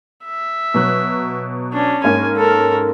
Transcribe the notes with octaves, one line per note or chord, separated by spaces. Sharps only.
E5
B2 F#3 F#6
C#4 D4
G#2 A#3 C#4 G#5
A4 A#4